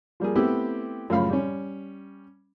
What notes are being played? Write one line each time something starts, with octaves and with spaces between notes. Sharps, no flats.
F3 G3 A#3 G#4
A3 B3 C4 E4 G4
F#2 A2 C#3 F3 F5 B5
G3 C#4